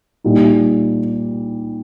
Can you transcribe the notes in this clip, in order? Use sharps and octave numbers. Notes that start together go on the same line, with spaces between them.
A#2 G3 D#4